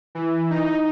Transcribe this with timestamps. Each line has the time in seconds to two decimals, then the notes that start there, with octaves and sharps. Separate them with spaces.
0.15 E3
0.50 D#4